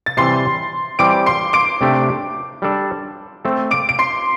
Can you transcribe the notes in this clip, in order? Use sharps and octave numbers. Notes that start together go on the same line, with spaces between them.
A6
C3 E3 G3 C4 C6 C7
E3 G3 C4 G4 C5 D6 D7
C6 C7
D6 D7
C3 A3 D4 G4
G3 D4 A4 D5
A3 C4 A4
D6 D7
D7
C6 C7